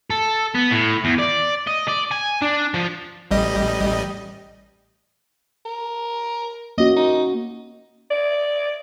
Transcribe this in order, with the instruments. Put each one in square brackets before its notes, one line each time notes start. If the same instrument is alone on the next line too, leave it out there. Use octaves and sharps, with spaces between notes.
[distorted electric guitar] A4
B3
A2
E2
D5
D#5
D5
G#5
D4
F3
[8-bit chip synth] A1 G3 D#5
[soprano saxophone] A#4
[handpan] A#3 C#4 F#4 [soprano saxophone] D#5
[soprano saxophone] D#4
[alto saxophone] D5